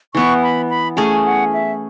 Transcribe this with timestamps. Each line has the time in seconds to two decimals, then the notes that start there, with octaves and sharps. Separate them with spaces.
0.14 E3 B3 E4 C#6
0.42 B5
0.69 B5
0.97 A3 C#4 G#4 G#5
1.25 F#5
1.53 E5